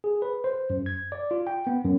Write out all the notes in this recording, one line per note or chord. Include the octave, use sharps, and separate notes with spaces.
G#4
B4
C5
F#2
G#6
D5
F4
G5
B3
F#2